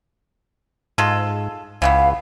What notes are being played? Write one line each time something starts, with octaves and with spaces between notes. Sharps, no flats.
G#2 G#3 F4 A4
C#2 C#3 E3 B3 F5